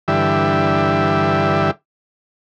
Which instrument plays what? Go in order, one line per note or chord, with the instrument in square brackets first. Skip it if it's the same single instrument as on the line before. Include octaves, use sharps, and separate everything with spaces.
[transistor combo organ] G2 D3 E3 G4 E5